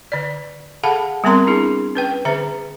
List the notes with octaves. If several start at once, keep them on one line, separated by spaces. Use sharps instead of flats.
D3 D5
G#4 A4 F5 F#5 A5 B5
G3 B3 C4 A#4 A#5 C6
D4 E4 G#4
C#4 B4 G5
D3 G#4 C5 E5 A#5